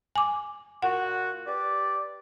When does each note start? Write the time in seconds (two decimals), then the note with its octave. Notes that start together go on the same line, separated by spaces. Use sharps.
0.16 G#5 D6
0.82 A#2 F#4 F#5
1.46 G4 B4 D5